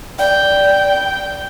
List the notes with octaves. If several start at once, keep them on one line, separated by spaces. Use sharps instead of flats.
D5 G5